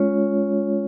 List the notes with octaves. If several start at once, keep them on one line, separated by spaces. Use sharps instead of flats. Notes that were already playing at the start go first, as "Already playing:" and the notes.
Already playing: G#3 C#4 F4 C#5